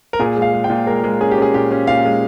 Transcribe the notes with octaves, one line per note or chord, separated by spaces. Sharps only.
A#4
A#2 G#4
G#3
F5
G#3
G5
A#2
G#3 A#4
G#3
C#4 G#4
G4
C#4 G#4
A#2 G4
C#4
A#2 F5
G#3